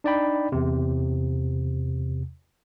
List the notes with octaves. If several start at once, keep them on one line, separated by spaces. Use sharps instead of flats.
D4 D#4 D5 D#5 G5 B5
E2 C3